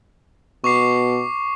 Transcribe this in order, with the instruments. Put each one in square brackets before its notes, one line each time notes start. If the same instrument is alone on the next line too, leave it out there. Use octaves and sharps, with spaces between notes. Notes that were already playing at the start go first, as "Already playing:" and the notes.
[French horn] B2 [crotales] C#6 D6 C7